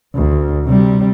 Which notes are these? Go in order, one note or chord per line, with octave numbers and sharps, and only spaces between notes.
D2
C3 G3